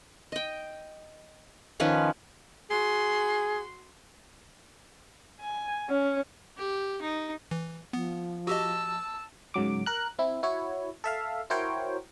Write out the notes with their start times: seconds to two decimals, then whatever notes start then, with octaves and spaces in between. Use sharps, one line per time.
0.32 D#5 G5
1.80 D#3 F3 C#4 B4
2.70 F#4 G#4 C6
5.40 G#5
5.89 C#4
6.58 G4
7.01 D#4
7.51 E3
7.93 F3 B3
8.47 F#4 G4 D#5 A5 E6
9.54 G#2 C#3 F#3 D6
9.86 A#4 F#6
10.19 C4 E4
10.43 E4 F#4 C#5
11.04 A4 E5 F5
11.50 E4 F#4 A#4 C5 C#5 G5